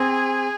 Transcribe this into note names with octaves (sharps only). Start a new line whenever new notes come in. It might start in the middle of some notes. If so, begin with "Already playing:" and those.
Already playing: C4 G#4